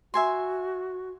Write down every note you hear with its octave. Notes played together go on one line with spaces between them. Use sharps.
F#4 E5 G#5 C6